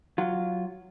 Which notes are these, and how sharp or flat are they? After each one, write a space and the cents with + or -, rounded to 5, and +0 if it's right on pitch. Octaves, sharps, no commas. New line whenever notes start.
F#3 +0 F4 +0